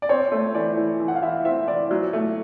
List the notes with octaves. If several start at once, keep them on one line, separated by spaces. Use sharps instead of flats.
D5
C4 C#5
A3
E3 D5
E3
E3
F#5
F5
E3 E5
C4 E5
E3 D5
F#3
A3